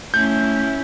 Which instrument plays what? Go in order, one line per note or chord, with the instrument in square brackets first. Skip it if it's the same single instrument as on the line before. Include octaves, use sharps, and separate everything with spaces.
[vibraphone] A3 [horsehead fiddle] C#4 E4 [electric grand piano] G6